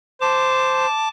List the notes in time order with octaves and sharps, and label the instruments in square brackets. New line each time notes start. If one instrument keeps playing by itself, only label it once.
[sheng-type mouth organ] C5 [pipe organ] A5 D6